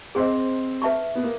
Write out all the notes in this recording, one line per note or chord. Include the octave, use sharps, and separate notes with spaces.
C4 G#4 C5 D#5
B4 E5 A5 C#6
B3
A#3